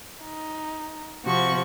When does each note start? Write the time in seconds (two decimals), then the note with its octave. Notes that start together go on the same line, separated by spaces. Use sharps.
0.24 D#4
1.24 C3 F3 F#4 C#6